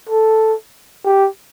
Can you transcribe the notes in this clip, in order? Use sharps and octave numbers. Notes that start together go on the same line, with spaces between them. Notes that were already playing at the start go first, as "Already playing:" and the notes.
A4
G4